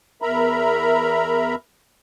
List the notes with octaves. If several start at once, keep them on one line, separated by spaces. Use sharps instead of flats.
E2 A#4 E5 A#5 B5